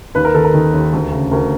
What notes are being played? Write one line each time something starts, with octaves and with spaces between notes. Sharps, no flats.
D#2 B4
A#4
D#3 A4
A#4
D#3
D#2
D2
C#3
D2 A#4